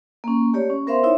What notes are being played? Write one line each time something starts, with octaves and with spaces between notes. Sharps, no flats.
A#3 C#4
A3 G4 C#5 D5
C#4
B3 A#4 C5 E5 F5 C6
D#4 E4 C#5 E5